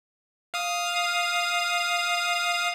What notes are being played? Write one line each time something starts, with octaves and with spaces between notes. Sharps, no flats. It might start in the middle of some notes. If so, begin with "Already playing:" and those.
F5 D#6